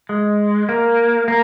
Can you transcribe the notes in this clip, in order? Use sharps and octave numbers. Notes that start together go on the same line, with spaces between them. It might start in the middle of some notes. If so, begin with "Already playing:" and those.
G#3
A#3
A#3